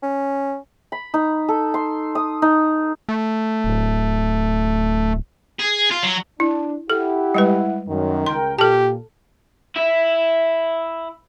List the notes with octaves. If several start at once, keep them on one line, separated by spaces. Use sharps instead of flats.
C#4
B5
D#4
A4
C6
D#6
D#4
A3
D1
G#4
F4
F#3
D4 E4
E4 G4 A4 F#5
G3 G#3 B4
F#2 D#3
C#2 A#4 G5 C6
A#2 G4 A4 A5
E4 E5